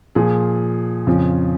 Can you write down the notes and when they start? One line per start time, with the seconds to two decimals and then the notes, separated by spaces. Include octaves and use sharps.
0.15 A#2 F3 G#4
1.07 F2 C#3 F3